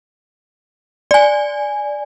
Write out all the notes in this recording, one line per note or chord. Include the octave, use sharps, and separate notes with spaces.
D5 G#5